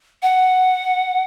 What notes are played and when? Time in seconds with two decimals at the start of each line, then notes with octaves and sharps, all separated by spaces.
0.22 F#5